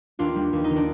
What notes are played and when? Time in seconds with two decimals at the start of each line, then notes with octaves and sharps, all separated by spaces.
0.19 D#2 D4 F4
0.36 G3
0.53 D#2
0.64 D#4
0.70 D#3
0.76 D4